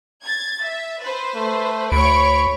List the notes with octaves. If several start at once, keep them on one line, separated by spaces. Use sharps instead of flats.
G#6 A6
E5
B4 C5
A3
D2 C#5 B5 C#6 D7